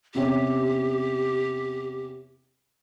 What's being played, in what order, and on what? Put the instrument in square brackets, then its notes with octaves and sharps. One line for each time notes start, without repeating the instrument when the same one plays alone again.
[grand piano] E2 C3 C#4 [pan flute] G4